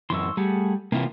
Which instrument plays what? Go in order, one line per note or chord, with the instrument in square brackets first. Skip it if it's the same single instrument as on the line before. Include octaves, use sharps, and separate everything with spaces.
[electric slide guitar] F#2 E3 [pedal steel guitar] C6 C#6 E6
[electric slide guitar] G3 [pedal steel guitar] A3 G#4 F#5
[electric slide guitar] C3 E3 [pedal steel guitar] A#3 F4